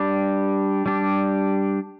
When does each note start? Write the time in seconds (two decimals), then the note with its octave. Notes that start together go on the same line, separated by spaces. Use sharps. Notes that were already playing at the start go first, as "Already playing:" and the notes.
Already playing: G3 D4 G4
0.86 G3 D4 G4